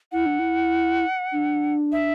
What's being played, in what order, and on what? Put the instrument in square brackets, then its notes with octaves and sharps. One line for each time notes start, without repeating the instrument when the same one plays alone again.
[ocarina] E4 [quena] F#5
[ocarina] D4
E4
D4
[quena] E5